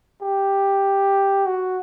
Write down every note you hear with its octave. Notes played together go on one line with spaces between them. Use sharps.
G4
F#4